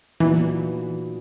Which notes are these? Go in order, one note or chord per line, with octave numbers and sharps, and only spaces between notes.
A#2 E3 F#3 B3 D#4